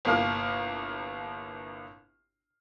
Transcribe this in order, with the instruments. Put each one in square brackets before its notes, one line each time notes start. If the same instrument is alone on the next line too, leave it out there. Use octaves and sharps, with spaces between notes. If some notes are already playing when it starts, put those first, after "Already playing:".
[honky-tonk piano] G1 C2 A#3 F5 F6